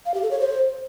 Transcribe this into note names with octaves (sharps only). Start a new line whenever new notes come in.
F5
G4
A4
C#5
C5